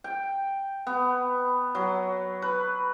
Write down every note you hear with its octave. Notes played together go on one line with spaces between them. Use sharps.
G5
B3
F#3
B4